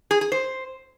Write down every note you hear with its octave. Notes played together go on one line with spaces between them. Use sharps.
G#4
G#4
C5